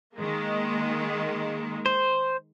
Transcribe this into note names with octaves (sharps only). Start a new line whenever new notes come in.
D#3 G#3 A#3
C5